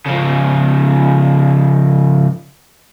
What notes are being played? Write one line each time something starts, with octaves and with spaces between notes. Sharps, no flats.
C#3 F3